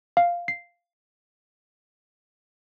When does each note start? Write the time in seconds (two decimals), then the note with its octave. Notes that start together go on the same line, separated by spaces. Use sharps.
0.17 F5
0.48 C7